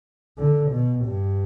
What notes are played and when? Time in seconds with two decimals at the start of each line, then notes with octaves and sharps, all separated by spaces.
0.38 D3
0.71 B2
1.05 G2